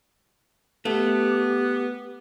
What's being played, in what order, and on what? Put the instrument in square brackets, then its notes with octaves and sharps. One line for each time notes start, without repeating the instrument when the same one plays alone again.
[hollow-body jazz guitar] A3 [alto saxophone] B3 [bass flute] G4